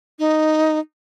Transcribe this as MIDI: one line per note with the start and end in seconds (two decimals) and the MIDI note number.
0.19 0.79 63